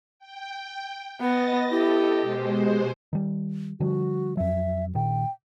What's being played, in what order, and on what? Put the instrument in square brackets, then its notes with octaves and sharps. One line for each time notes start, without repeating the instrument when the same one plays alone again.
[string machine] G5
[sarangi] B3 [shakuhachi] B4 [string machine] D#5 A6 A#6
[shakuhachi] E4 [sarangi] G4 [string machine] A4 D#5
[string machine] B2 G#3 C5
[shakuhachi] G4
[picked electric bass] D#3 G3
[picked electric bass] D3 F3 G3 [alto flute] F#4
[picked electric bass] F2 F#3 [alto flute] E5
[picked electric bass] A#1 A#2 D#3 [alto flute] G5